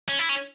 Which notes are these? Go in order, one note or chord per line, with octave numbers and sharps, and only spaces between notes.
C#4
E4
C#4